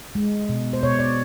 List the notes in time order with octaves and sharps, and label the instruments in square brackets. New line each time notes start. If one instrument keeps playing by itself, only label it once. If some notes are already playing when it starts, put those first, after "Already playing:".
[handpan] G#3
B2
C5
B2 C#5
D5